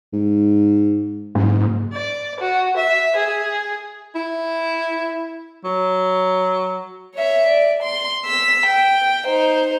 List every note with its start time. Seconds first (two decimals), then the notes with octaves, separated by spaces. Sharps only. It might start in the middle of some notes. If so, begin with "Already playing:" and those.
0.13 G#2
1.35 F#1 G#2
1.93 D5
2.40 F#4
2.77 E5
3.16 G#4
4.15 E4
5.64 F#3
7.14 C#5 E5
7.46 D5
7.83 C6
8.25 E6 B6
8.66 G5
9.26 D#4 C5